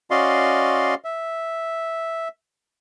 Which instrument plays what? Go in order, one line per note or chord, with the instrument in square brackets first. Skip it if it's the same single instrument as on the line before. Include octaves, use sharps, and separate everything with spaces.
[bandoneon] C#4 F#4 D5 D#5 F5 C6
E5